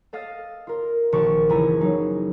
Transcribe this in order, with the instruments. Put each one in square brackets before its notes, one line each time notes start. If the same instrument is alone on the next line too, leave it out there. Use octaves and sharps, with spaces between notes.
[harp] A4 D#5 F5 D#6 F6 A6
F4 A#4
A#1 D#3 F#4 A5 C#6
F#1 E3 E4 A4 G#5 A#5
F#3 D#4